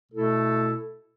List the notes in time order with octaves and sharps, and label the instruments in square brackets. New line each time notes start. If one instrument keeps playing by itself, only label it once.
[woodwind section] B2 A3 E4 A4